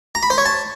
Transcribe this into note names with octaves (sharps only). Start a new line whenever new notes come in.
A#5
B5
C5
C#5
A5